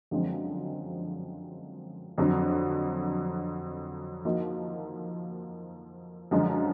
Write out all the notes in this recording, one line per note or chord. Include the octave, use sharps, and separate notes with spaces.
F#2 D3 F3 G#3 C4
F2 D3 F#3
F3 A#3 D#4 F#4
F#2 D3 F3 G#3